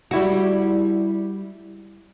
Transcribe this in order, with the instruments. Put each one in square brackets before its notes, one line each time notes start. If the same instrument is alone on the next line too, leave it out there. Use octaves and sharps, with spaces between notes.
[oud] G3 E4 F#4